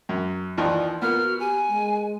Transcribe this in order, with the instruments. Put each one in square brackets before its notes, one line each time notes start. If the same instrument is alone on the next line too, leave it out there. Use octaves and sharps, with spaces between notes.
[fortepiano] F#2
[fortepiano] D#2 E3 F3 [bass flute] D5
[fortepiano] A#3 B3 [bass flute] F4 [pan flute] F6
[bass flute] F#4
[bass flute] G4 [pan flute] G#5
[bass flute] G#3